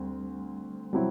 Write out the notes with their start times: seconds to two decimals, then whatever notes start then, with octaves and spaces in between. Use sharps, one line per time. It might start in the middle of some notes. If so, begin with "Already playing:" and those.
Already playing: D2 G3 C4
0.93 C3 F#3 G3 C4 E4